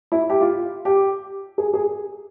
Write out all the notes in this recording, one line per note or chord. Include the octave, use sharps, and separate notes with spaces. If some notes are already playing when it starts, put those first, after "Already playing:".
E4
G4
F4
G4
G#4
G#4